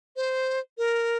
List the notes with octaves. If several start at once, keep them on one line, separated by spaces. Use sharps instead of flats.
C5
A#4